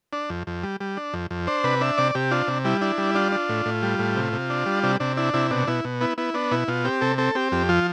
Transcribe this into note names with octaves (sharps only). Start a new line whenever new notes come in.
D4
F2
F2
G3
G3
D4
F2
F2
D4 C5
C3 B4
D4 E5
C3 D5
C3 G4
D4 F4
C3
G3 E4
D4 E4
G3
D4 F4
D4
A2
A2
G3
A2
C3
C3
D4
G3
C3 D4
C3 D4
D4 E4
C3 E4
B2 D4
B2 E4
B2
B3 E4
B3 E4
B3 D4
B2 E4
B2 F4
C4 G4
C3 A4
C4 A4
C4 G4
F2 G4
F3 F4